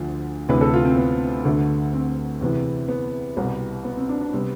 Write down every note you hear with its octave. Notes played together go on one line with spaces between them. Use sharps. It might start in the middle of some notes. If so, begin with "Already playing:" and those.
Already playing: D2 D3 F3
D2 C3 E3 B4
A4
F4
C4
B3
D2 D3 A3
C4
E2 C3 E3 B3
B3
C2 B2 G3 B3
B3
C4
D4
D4
C3 G3 B3 C4